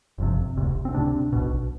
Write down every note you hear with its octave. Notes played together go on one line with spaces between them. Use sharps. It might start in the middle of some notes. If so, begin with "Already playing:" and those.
G1 F2 C3
E1 D2 C3
C4
D2 C3 D4
B1 B2